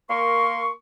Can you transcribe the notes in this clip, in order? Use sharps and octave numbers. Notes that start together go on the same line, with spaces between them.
A#3 A#4 C6 C#6